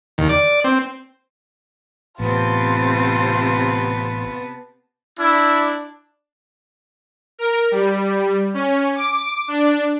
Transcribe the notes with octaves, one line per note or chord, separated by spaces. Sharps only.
D#2
D5
C4
A1 C3 B3 C4 F4 A5
D4 E4
A#4
G3
C#4
D6
D4